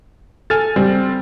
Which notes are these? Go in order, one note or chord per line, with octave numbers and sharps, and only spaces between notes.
A4 G#5 F6 A6
G3 C4